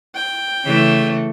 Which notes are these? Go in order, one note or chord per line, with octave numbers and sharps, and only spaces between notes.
G5
C#3 E3 A3